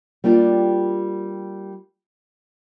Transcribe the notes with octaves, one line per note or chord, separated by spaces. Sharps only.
G3 A#3 D4 F4 G4